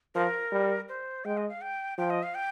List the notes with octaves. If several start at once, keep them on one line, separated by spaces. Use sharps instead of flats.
F3 A#4
G3
C5
G#3 G5
D#5
F5
G5
F3 G5
D#5
F5
G5